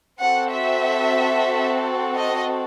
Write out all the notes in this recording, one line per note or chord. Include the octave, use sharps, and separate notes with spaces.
C4 F#4 A4 F#5
E5
D#5